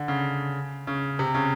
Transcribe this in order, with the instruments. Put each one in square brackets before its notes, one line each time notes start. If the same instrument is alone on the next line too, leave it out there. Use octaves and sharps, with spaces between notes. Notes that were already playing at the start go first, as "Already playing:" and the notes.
Already playing: [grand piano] D3
C#3
C#3
C3
C#3